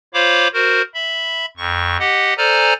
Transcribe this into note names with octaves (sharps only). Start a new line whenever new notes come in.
F4 C5 C#5 F5 B5 D6
F#4 A#4 C5
E5 B5
F2 C#6
G4 D#5 F#5
A4 C5 D5 G#5 A#5 F6